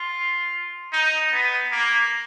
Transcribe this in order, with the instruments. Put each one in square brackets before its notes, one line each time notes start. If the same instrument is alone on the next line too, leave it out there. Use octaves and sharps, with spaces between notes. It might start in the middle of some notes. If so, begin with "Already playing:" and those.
Already playing: [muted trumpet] F4
D#4
B3
A#3